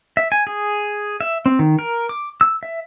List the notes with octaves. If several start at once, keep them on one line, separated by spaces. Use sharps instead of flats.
E5
G#5
G#4
E5
C4
D#3
A#4
D6
E6
E5